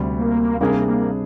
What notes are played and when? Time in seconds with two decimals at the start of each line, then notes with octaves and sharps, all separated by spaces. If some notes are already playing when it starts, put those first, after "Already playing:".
Already playing: D2 C3 G3
0.19 A#3
0.61 C3 G3 A#3 D4 G#4
0.88 A#3